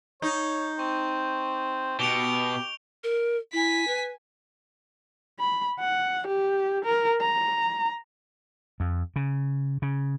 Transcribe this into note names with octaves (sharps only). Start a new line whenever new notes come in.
D#4 C#5 G6
C4 C#6
B2 G4 D7 F7 G7
A#4
E4 G#5 B6
B4
B5
F#5
G4
A#4
A#5
F2
C#3
C#3